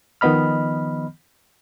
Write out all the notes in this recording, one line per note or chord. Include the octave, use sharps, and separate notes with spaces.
D#3 F3 B3 D#5 B5 F6